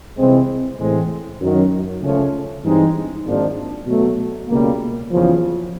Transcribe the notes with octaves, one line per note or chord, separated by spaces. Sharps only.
C2 C3 E3 G#3 C4
A2 E3 G#3 C4
F#2 D#3 F#3
C#2 C#3 F3 A3 C#4
G2 E3 G#3 C4 D#4
G#1 G#2 F3 A#3 D4
B2 F#3 A3
C#2 B2 G3 A#3
F#1 E2 C#3 F3